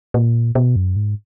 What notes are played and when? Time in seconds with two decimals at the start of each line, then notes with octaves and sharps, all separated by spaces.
0.14 A#2
0.55 B2
0.76 F#2
0.96 G#2